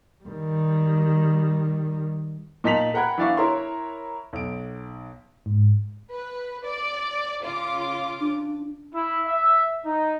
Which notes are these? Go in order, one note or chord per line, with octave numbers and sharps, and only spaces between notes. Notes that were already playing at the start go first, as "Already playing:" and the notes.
D#3 G3
A#2 D#4 A5 B6 F7 F#7
A#4 F#5 G5 B5 F#6 G#6
E3 D4 D5 E5 F5 C#6
E4 A#4 C#5 C6
B1 D7
G#2
B4
D5
C#3 F4 D6
D4
E4
E5
D#4